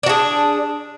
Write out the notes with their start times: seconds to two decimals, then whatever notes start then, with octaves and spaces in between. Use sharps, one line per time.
0.03 D4
0.06 F#4
0.09 G#4